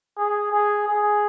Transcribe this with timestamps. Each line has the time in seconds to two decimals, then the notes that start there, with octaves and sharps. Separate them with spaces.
0.17 G#4
0.53 G#4
0.88 G#4